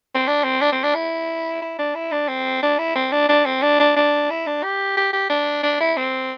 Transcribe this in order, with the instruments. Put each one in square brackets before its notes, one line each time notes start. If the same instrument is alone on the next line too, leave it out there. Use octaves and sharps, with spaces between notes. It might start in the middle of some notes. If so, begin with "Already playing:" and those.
[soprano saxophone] C4
D4
C4
D4
C4
D4
E4
E4
D4
E4
D4
C4
D4
E4
C4
D4
D4
C4
D4
D4
D4
E4
D4
G4
G4
G4
D4
D4
E4
C4